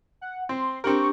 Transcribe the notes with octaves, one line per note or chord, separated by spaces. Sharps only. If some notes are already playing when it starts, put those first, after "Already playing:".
F#5
C4 C6
C4 D4 G4 A#4 C#6